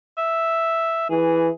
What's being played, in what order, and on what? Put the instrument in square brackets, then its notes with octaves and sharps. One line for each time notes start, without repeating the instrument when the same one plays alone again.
[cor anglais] E5
[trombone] E3 [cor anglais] G#4